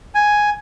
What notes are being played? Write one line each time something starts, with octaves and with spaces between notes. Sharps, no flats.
G#5